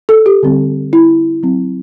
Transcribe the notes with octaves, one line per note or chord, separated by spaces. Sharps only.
A4
G4
D3 G3 C4
E4
F#3 C4